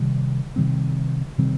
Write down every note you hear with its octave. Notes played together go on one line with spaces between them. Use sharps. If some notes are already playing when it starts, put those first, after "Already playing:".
Already playing: C3 D#3 G3 C4
C3 D#3 G3 C4
C3 D#3 G3 C4